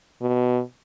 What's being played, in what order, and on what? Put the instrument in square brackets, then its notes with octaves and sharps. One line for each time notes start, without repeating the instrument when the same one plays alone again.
[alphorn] B2